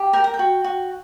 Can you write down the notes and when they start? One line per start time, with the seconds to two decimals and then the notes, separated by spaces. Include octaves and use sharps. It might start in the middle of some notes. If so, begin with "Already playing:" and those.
Already playing: G4
0.13 A#4 G5
0.24 A#5
0.34 G5
0.39 F#4
0.64 F#4